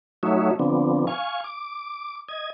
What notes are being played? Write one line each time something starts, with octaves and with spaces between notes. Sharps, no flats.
F#3 A3 D#4 F#4 C#5 E5
D3 F3 B3 C4 D4
F5 G#5 C#6
D6
D#5 G#6